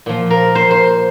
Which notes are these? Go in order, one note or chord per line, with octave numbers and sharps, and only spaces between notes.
A#2 F3
A#4
C5
C5